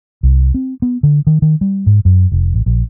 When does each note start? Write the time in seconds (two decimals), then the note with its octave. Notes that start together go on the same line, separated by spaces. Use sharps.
0.23 C2
0.54 C4
0.82 B3
1.03 D3
1.27 D#3
1.42 D#3
1.61 G3
1.86 G#2
2.05 F#2
2.32 F1
2.54 A1
2.66 A#1